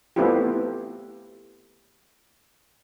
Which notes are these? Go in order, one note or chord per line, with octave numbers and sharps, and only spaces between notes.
A3 B3 C4 E4 F4 G4